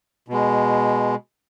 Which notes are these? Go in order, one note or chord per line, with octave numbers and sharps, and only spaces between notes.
B2 G#3